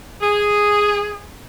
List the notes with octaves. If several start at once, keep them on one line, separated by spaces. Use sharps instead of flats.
G#4